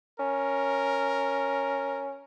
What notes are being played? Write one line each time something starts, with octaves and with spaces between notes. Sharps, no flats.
C#4 A#4